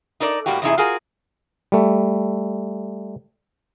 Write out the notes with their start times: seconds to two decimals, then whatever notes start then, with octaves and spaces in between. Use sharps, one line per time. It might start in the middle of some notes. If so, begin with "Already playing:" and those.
0.20 D#4 A4 A#4 D5
0.46 A2 G3 A#3 F#4 G4
0.62 E2 C3 D#4 E4 G#4
0.78 F4 F#4 G#4 A#4
1.72 G3 A3